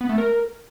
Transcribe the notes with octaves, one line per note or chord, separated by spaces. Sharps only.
B3
A3
A#4